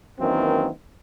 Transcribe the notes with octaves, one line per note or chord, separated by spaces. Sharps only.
F#2 D#3 E3 A#3 C4